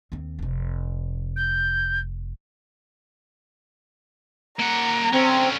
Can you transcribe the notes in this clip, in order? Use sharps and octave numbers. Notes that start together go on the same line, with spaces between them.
D#2 C4
F1 C3
G6
A#3 F#5 A#5
D3 C4 C#4